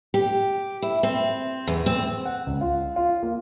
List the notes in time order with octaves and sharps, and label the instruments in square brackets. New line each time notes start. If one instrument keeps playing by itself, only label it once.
[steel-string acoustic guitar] G4
E4
C4
E2
C4
[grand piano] F#5
C#2
F4
F4
A#3